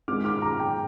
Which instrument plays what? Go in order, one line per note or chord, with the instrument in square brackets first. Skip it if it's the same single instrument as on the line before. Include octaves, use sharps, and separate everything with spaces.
[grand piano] D#3 G#3 C4 F4 D6 F6
D6 F6
A#5 D6
G5 A#5